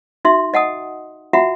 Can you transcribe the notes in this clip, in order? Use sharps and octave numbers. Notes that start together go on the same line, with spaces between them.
D#4 F#4 E5 C6
D#5 F#5 A5 D#6
F4 F#4 E5 F#5 A#5